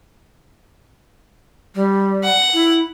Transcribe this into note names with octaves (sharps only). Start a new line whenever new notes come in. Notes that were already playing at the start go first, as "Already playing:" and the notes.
G3
F#5
E4